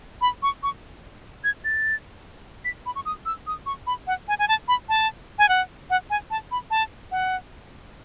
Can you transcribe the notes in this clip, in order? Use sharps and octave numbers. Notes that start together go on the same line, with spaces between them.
B5
C#6
C#6
G#6
A6
B6
B5
C#6
D#6
E6
D#6
C#6
B5
F#5
G#5
G#5
A5
B5
A5
G#5
F#5
F#5
G#5
A5
B5
A5
F#5